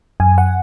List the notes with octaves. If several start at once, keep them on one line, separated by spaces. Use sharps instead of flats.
F#2 G#5
F#5